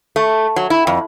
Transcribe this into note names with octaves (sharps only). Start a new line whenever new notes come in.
A3
F#3
E4
F2